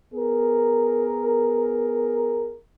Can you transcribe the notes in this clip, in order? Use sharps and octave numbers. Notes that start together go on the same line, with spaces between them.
B3 G#4 A#4